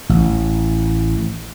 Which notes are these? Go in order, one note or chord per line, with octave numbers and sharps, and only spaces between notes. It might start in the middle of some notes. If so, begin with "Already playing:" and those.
A1